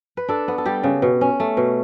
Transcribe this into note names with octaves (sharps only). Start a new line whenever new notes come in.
B4
D4 A4
B3
A4
G3 G4
C#3
B2
C#4
A3
B2